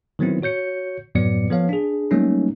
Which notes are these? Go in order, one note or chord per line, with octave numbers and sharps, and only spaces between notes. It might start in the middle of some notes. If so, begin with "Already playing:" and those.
D#3 F#3 B3 C4 E4
F#4 C#5 G6 C#7
F#2 A2 F#3 B3 D5 C#7
F3 B3 A4 C#5 F5
D4 G#4
F#3 G3 A3 A#3 C#4 D#4